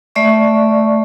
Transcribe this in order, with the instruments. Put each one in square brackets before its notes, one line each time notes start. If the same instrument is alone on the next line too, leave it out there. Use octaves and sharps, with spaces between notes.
[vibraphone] A3 D5 E5 C#6